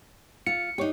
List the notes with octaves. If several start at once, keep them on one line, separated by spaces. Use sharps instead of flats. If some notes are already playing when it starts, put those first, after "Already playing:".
F4 C#7
D4 D#4 G4 C#5